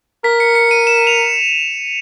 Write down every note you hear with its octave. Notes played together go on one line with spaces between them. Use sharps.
A#4 B6
C#7
C#7
D#7
E7
F7